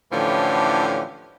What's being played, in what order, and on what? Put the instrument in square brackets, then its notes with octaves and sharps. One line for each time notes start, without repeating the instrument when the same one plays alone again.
[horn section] A2 D3 E3 F3 C#4 G4